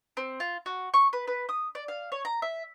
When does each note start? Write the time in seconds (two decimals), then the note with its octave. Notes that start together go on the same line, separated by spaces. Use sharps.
0.17 C4
0.40 F4
0.66 F#4
0.94 C#6
1.13 B4
1.28 B4
1.49 D#6
1.75 D5
1.88 F5
2.12 C#5
2.25 A#5
2.42 E5